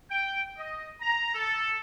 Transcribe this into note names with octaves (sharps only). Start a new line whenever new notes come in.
G5
D#5
A#5
A4